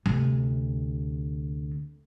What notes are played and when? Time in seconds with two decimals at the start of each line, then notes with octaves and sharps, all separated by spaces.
0.06 D2 C3